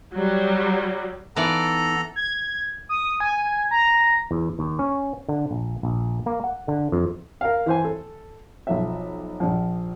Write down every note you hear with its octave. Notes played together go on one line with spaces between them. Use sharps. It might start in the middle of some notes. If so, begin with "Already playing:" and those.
F#3 G3
E3 B3 D#4 F4 A4 D5 A#5
G#6
D#6
G#5
A#5
E2
D#2
C#4
D3
A#1
A#1
A#3
F#5
D3
F2
A#4 F5
E3 C5 G#5
A4
B1 F3 E5
A#1 F3